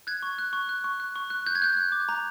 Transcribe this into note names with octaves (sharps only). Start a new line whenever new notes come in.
F#6 G#6
C#6
F#6
C#6
F#6
C#6
F#6
C#6
F#6
F#6 G6
G#6
F#6 G6
F#6
D6
A#5